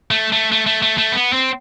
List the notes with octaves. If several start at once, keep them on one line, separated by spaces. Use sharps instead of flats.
A3
A3
A3
A3
A3
A3
B3
C4